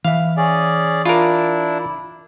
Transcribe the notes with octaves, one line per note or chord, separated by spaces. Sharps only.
E3 E5 F5
C#4 G#4 D5
D4 E4 F4 A#4